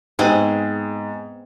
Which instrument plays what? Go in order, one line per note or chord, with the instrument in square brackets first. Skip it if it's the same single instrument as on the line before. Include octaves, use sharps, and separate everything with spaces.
[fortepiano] G#2 [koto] B3 C4 G#4